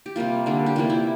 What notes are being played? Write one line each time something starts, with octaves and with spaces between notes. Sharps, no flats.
G4
C3 G3 A#3 F4
D3 G3 A#3
G4
C3 E3 A#3 F4
E4